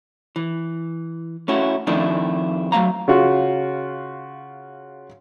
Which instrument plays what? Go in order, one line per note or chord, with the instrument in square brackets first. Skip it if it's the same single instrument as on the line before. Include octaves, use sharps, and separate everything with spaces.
[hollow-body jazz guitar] E3
A3 C#4 E4 F#4
F2 D#3 A3 D4 E4
F#3 A3 F5 A#5
[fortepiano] C#3 F4 F#4